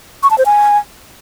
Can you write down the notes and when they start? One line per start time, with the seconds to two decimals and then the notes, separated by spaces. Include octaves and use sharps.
0.23 C#6
0.31 A5
0.38 C5
0.46 G#5